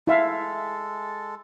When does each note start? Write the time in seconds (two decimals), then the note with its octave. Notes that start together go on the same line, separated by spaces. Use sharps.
0.07 G#3 E4 A4 E5 F5